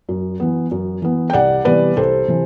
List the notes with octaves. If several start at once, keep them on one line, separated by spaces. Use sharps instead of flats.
F#2
E3 B3
F#2
E3 B3
G5
C2 D5 F#5
C3 E3 G3 B3 B4 D5
C2 A4 C5
C3 E3